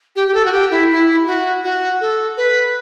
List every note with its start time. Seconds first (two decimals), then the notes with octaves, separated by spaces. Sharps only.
0.15 G4
0.27 G4
0.34 A4
0.45 F#4
0.52 G4
0.70 E4
0.90 E4
1.26 F#4
1.63 F#4
2.00 A4
2.37 B4